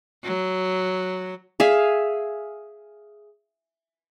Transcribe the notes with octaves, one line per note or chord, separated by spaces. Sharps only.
F#3
G#4 E5 F5